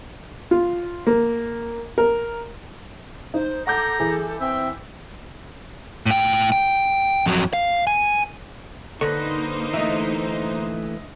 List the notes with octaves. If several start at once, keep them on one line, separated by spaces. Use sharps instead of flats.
F4
A#3
A#4
D#4 C5
A4 F#5 A#5 D6 G6
E3 G#4
C4 E5 G5
A2 G5
G5
F2 F#3
F5
G#5
D3 A#3 D#4 B4 C5 D#5 C#6
E3 A3 D#5 E5